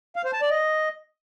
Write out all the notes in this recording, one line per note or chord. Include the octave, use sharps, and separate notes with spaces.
F5
C5
A5
D5
D#5